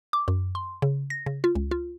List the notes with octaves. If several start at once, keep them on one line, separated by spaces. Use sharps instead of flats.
D6
F#2
C6
C#3
A#6
C#3
F4
C#2
F4